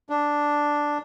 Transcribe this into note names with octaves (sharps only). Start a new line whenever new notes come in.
D4